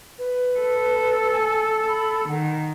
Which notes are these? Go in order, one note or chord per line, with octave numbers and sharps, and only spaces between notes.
B4
A4
G#5
B5
D#3 F#5